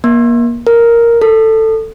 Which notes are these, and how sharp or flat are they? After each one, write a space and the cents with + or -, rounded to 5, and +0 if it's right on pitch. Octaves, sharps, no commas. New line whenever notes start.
A#3 +30
A#4 +0
A4 +15